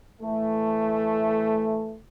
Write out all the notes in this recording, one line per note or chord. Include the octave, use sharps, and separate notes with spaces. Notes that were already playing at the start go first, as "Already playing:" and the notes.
A2 E3 A3